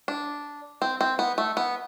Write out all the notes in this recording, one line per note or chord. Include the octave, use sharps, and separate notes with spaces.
D4
C4
C4
B3
A3
B3